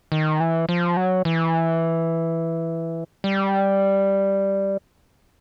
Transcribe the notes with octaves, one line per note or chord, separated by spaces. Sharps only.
D#3
E3
F3
F#3
E3
G3